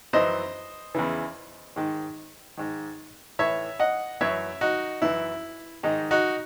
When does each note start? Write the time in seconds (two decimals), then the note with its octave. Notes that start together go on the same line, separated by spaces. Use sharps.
0.13 F#2 E3 C5 D#5
0.95 E2 C#3 E3
1.76 G#2 D#3
2.57 G#2 D#3
3.39 A2 E3 C#5 E5
3.80 D#5 F#5
4.21 F#2 E3 C#5 E5
4.61 D#4 F#4
5.02 F#2 E3 E4
5.83 G#2 D#3 D#4
6.11 D#4 F#4